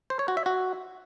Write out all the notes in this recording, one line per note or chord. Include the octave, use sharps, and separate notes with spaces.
C5
C#5
F#4
E5
F#4